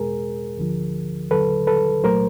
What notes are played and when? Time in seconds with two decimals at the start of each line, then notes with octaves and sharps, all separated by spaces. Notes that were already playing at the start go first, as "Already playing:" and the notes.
Already playing: E2 B2 G#3 G#4 A#4
0.57 D2 D3 F3
1.31 D#2 D3 F#3 A4 B4
1.67 A4 B4
2.04 C2 A#2 F#3 A3 A#4 C5